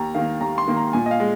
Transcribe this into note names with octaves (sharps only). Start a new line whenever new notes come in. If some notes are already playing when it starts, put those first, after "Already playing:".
Already playing: D#2 A#5
D#3 A#3 F5
D#2 A#5
C6
D#3 A#3
A#5
A#2 G#5
D#5
F5
G#3